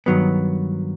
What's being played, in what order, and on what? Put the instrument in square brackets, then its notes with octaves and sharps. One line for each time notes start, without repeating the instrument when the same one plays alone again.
[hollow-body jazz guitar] G2 D#3 F#3 B3